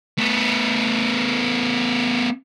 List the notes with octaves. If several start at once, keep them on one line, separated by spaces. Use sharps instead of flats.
A3 B3